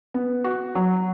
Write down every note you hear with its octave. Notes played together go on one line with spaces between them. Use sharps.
B3
F#4
F#3